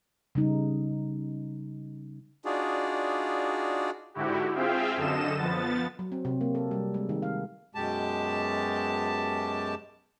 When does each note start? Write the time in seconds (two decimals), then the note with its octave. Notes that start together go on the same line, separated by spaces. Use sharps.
0.35 C#3 G3 D#4
2.45 D4 D#4 F4 F#4 G#4 D5
4.14 G#2 D3 E4 F#4 G4
4.54 C4 F4 G#4 E5 F5 G5
4.96 F#2 D3 A4 D#5 E7
5.37 F3 B3 A6
5.99 F#3
6.12 C4
6.25 C3
6.41 A#3
6.55 A4
6.71 G3
6.94 G#3
7.09 D#3
7.22 F5
7.75 F#2 B2 G#3 G4 A5